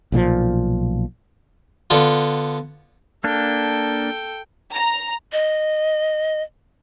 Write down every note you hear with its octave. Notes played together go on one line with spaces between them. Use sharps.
B1 A#2 C#3 F3
D3 B3 F4
A#3 D4 A4 G5
A#5
D#5